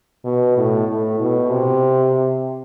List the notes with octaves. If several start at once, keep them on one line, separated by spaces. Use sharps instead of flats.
B2
A2
A2
B2
C3